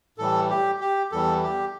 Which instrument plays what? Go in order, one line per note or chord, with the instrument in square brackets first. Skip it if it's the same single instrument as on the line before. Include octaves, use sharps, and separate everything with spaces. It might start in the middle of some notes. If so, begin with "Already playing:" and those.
[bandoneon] A2 E3 G3 A4
G4
G4
E2 E3 G3 A4
G4